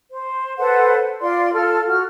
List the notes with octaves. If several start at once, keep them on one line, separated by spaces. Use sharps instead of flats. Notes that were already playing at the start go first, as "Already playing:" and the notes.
C5
A4 B4 C5 F#5
F4 D5 C6
F4 A4 F6
F#4 F6